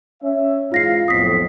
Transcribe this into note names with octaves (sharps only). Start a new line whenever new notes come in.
C#4 E5
G#2 E3 F4 F5 A#6 C7
B1 F2 A2 D#6 B6